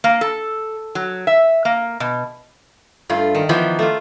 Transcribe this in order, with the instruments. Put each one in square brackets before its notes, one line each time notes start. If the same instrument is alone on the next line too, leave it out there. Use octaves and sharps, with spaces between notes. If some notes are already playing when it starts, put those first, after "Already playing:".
[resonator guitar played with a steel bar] A#3
A4
F#3
E5
A#3
B2
G2 A3 F4
[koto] D#3
[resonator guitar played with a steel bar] E3 F3 B3
[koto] A3 F4